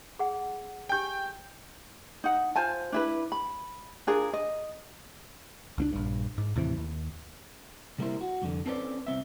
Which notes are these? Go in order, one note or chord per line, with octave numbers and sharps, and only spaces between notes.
G#4 F#5
G4 G5 G#5 G6
D#4 F#5
F4 C5 G#5 A5
D4 E4 B4
B5
D4 F4 G#4 A#4
D#5
C#2 C4 D4
A#1 G2
G#2
D#2 A2 C3 E3
D#2
C3 G3 A#3 E4 A#4 C5
F#4
C2 F2 D3
C4 C#4 A4 B4 C5 D5
C2 C4 E5